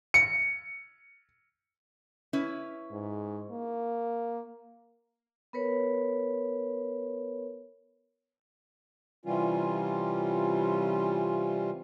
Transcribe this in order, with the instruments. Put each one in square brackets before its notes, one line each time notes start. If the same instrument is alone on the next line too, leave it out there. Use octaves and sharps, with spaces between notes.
[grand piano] C#7
[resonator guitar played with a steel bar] C#4 E4 B4
[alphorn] G#2
A#3
[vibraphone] B3 A#4 B4 C#5
[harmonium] C3 E3 G3 C#4 F4